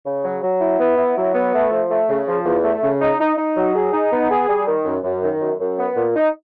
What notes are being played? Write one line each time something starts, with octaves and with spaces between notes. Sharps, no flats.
C#3
F#3
F#3
E4
B3
E4
F#3
B3
A3
F3
A3
C#3
F3
E2
A3
C#3
D#4
D#4
D#4
F#3
G#4
D#4
B3
G#4
G3
D#3
F#2
F#2
D#3
F#2
F#2
B3
A#2
D#4